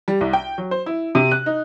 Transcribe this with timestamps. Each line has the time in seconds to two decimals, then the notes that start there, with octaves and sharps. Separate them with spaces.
0.08 G3
0.21 C2
0.33 G5
0.58 F#3
0.71 C5
0.86 E4
1.15 C3
1.31 F#6
1.46 D#4